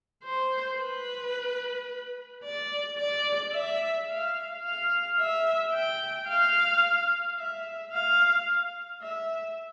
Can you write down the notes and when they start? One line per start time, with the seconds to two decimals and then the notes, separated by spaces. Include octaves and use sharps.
0.24 C5
0.79 B4
2.44 D5
2.98 D5
3.53 E5
4.08 F5
4.63 F5
5.18 E5
5.73 G5
6.28 F5
7.38 E5
7.92 F5
9.01 E5